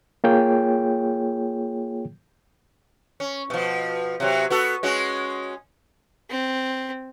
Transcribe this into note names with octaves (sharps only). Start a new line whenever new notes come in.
A#3 F4 G#4 C#5 G5
C#4
B2 F3
C3 F#3
B3 F#4 A4
G#3 C#4 F#4
C4